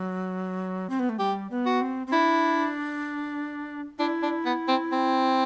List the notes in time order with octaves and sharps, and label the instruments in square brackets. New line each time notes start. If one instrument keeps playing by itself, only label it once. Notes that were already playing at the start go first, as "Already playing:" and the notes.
Already playing: [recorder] F#3
C4
B3
A3
[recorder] G3 [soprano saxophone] G4
[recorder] B3
[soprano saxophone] F#4
[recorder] C4
C4
[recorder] D4 [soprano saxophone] E4
[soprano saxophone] D4 [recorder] E4
[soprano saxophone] D4
B3
C4
C4